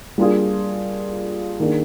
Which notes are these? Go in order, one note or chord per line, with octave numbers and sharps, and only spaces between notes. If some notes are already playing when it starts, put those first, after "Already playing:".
G3 A#3 D4 F4 G#4
D#3 A#3 D4 G#4